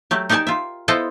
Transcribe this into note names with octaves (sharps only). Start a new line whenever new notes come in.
F#3 A3 G4
D#4 G4 A#4 D5 G#5 A5
F4 E5
B3 E4 F4 A4 C5 D#5